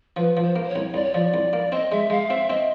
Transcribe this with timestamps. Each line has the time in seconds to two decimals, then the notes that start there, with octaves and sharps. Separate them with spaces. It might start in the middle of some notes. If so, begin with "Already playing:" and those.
0.16 F3 B4
0.37 F3
0.43 C5
0.56 A#3
0.64 C5
0.69 C#5
0.76 C2
0.94 C2 D5
1.04 C#5
1.14 F3 D5
1.34 C2
1.53 A#3
1.71 C4 D#5
1.91 G#3 E5
2.10 G#3 F5
2.30 C4 E5
2.49 C4 D#5